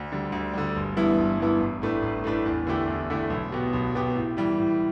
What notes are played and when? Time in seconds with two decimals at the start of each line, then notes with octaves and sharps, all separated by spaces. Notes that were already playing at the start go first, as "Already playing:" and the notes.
Already playing: D2
0.12 D3 G3
0.32 D2
0.53 D3 G3
0.76 G1
0.97 G2 E3 B3 E4
1.18 G1
1.39 G2 E3 B3 E4
1.60 A1
1.82 A2 A3 D4 B4
2.02 A1
2.24 A2 A3 D4 B4
2.46 E2
2.67 D3 A3 E4 G4
2.88 E2
3.10 D3 A3 E4 G4
3.30 B1
3.52 B2 B3 G4
3.73 B1
3.95 B2 B3 G4
4.15 A2
4.37 E3 G3
4.58 A2